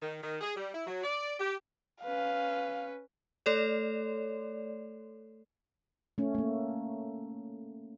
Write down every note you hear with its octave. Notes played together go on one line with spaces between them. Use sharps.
D#3
D#3
G#4
G3
E4
F#3
D5
G4
C#4 B4 F5
A3 A4 C#5 D5
A3 C#4
A3 A#3